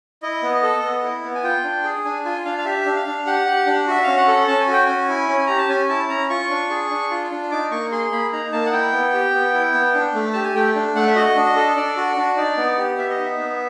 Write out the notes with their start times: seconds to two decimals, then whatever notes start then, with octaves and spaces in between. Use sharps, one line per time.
0.22 E4 D#5
0.43 B3
0.63 A4
0.83 B3
1.03 E4
1.24 B3
1.35 G#5
1.44 F4 G5
1.64 D4
1.84 G#4
2.05 D4 G#5
2.25 F4 G#5
2.45 D4 F5
2.58 F5
2.65 G4 E5
2.86 D4
2.96 F5
3.06 D4
3.26 G4 F#5
3.46 G4
3.67 D4
3.87 F#4 E5
4.04 C#4 F5
4.17 F#5
4.27 A4
4.47 C#4 A5
4.60 G#5
4.68 F#4 G5
4.86 C#4 G#5
5.09 E4
5.28 C#4
5.46 G4 A#5
5.58 A5
5.69 C#4 G#5
5.89 E4 A5
6.09 C#4 A#5
6.30 F4 C#6
6.50 D4
6.70 G#4
6.90 D4
7.11 F4
7.31 D4
7.51 D#4 D6
7.71 A#3 C#6
7.92 G#4 C6
8.12 A#3 B5
8.32 D#4 A#5
8.52 A#3 A5
8.66 F#5
8.73 E4 G5
8.93 B3
9.14 G4
9.34 B3
9.54 E4
9.74 B3
9.94 D4
10.14 A3
10.33 G4 A5
10.44 G#5
10.54 A3 G5
10.75 D4
10.95 A3 F#5
11.07 E5
11.16 F#4 D#5
11.36 D4
11.46 D#5
11.56 A4
11.76 D4 D5
11.97 F#4
12.17 D4
12.37 D#4 D5
12.57 B3
12.78 G4
12.98 B3 E5
13.10 D#5
13.18 D#4 E5
13.38 B3